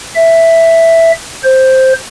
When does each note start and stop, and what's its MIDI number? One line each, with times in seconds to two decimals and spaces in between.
0.15 1.12 76
1.44 1.93 72